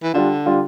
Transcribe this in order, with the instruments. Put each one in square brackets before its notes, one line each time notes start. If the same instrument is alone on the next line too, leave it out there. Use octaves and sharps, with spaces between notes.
[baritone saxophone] E3
[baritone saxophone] D3 [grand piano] G3 D4 F4
[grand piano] G3 D4 F4